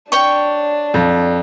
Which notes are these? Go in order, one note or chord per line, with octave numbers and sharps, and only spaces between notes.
D4 C#5 G5 C#6
F2